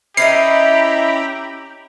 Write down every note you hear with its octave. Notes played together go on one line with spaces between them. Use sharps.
C#4 E4 G4 D#5 E5 A#5 B5 C7